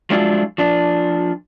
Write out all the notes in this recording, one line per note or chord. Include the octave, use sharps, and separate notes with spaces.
F3 F#3 G#3 D4 E4 F4
F3 D4